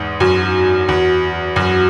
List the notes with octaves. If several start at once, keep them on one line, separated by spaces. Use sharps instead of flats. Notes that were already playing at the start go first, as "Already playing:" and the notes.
Already playing: E2 G#2
F#2 F#4
E2
F#2